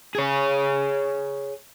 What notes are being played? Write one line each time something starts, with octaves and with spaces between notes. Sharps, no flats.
G#4 C#5